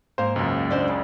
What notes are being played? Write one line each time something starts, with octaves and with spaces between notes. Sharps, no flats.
G#2 A#3 C5 F5
C#2 F#2
D4 C5 D5
C#3